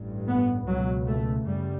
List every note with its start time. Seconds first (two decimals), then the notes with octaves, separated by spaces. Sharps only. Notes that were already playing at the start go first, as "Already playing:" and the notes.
Already playing: A1 G2
0.28 B3
0.67 C#2 B2 F#3
1.08 A3
1.47 F#2 C#3 G3